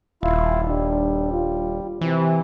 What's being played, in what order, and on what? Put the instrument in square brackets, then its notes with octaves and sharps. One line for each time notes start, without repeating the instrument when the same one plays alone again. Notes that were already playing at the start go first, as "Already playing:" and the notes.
[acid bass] D#1 [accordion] E4 F4
[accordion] G3 [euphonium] D4
[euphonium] F4
[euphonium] C3 [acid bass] E3